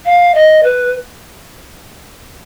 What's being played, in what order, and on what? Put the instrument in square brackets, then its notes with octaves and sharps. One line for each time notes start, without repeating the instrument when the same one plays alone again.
[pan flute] F5
D#5
B4